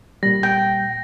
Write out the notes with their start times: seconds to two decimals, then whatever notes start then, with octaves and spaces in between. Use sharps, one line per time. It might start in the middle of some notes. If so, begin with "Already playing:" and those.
0.23 A#2 G3 A#6
0.43 G5